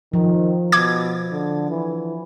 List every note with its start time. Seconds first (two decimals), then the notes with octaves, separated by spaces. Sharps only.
0.13 D#3 F3
0.72 B2 D6 G#6
1.32 D3
1.71 E3